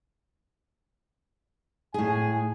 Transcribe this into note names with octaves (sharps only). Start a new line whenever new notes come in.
A2 G#4 G#5